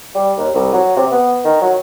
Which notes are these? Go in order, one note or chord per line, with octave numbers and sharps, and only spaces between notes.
G3
D#2
C2
F#3
C3
B3
D#3
F#3